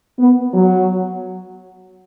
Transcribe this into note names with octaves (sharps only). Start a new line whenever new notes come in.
B3
F#3